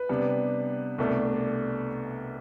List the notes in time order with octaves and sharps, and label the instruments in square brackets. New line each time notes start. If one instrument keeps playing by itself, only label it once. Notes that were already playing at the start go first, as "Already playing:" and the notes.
Already playing: [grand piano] B4
C3 G3 B3 D4
C2 B2 A3 D4